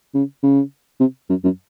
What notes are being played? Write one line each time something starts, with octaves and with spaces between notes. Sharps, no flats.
C#3
C#3
C3
F#2
F#2